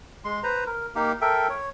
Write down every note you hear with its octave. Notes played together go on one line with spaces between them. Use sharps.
G#3 C6
B4 C5 A#5
A#4
A#3 D#4 G4 F5
A4 A#4 E5 G5
C#5